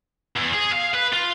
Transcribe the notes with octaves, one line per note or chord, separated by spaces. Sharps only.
E2
G#4
F5
B4
F4